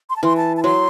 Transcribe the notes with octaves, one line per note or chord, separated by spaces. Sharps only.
C6
A5
E3 C6
A5
A5
F#3 C6